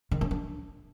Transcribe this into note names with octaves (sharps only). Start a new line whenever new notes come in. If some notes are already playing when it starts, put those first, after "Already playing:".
D#3
C#4
D4